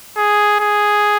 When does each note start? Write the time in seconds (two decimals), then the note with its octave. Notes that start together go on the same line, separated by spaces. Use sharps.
0.17 G#4
0.60 G#4